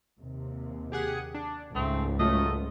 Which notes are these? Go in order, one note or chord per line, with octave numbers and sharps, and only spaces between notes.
D#2 C3
G4 G#4 F#5
D4
C#2 G#2 A3 C4
F#3 A3 F4 D#5